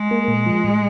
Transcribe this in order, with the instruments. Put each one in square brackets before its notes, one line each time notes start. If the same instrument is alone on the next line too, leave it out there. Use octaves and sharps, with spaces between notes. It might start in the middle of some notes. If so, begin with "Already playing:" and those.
Already playing: [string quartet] G#3
[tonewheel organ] A#3
A#2
F3
A2